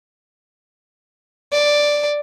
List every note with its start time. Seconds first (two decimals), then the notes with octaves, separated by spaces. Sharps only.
1.52 D5